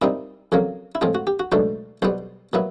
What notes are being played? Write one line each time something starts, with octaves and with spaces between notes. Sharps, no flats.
A#2 G3 C4 D#4 E4
F2 C#3 F#3 A#3
E4
A2 F3 G#3 C4 F4
F#4
G4
F#4
C#2 B2 F#3 A3 D4 C5
B1 B2 G3 B3 C5
A#2 F#3 B3 E4